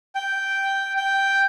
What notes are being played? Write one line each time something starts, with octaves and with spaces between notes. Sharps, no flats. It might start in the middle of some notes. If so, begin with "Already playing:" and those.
G5
G5